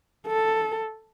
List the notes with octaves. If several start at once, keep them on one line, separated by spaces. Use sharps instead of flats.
A4